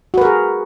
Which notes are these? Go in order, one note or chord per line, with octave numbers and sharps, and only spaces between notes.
F#4 G#4 A#4 B4